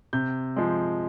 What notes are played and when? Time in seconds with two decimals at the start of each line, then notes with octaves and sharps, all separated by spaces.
0.13 C3 G6
0.56 F3 G#3